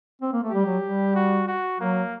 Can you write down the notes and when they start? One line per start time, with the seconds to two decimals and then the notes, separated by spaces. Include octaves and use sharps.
0.22 C4
0.33 A#3
0.44 A3
0.50 G3 G4
0.66 F#3
0.82 G3
1.16 F#4
1.48 F#4
1.80 F#3 A#3